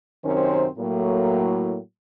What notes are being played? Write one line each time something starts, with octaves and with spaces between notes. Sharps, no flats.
F#2 C3 D#3 C4 C#4 C5
A2 F#3 A#3